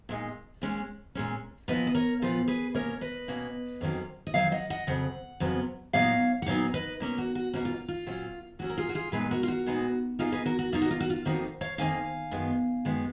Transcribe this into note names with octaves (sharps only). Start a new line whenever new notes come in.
A#2 G#3 D#4
A#2 G#3 C#4
A#2 G#3 C#4
A#2 F3 B3 B4 D#5
D#5
A#4 C#5
A#2 F3 B3 F4
G#4 B4
B2 A#3 C#4 A#4 C#5
B4 D#5
B2 A#3 C#4
F2 D#3 F#3 A#3 C#4
D#5
F2 D#3 F#3 C#5 F5
D#5 F#5
D#5 F#5
F2 C#3 F#3 F#5
F2 C#3 F#3 B3
A#2 F#3 B3 D#4 C#5 F5
F#5
A#2 F#3 B3 D#4 C#5 F5
B4 D#5
B2 A#3 C#4
F#4
F#4
B2 A#3 C#4 F#4
F4
F4
A#2 F#3 C#4
A#2 F#3 C#4 F#4
A#4
F4 G#4
F#4
F4 G#4
A#2 G#3 B3 D#4 G#4 B4
F#4 A#4
F4
F#4
A#2 G#3 B3 D#4
B2 A#3 D#4 F4 G#4
G#4 B4
F#4 A#4
F#4
B2 A#3 D#4 F4
F#4
F4
F#4
F4
F2 D#3 A#3 D#4 F#4
C#5 F5
F2 D#3 A#3 D#4 F5 G#5
F#2 D#3 G#3 B3
F#2 D#3 G#3 B3